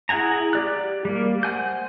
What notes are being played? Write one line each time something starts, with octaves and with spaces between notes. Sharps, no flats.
E4 G#4 F#5 G#5 A#5
G4 D5 F#6
G3 A#3
C5 F#5 G#5 G6